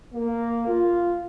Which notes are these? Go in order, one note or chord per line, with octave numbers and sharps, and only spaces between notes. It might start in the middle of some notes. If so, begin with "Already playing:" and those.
A#3
F4